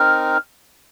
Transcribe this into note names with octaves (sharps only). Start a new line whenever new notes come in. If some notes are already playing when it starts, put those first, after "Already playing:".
Already playing: C4 D#4 A#4 F6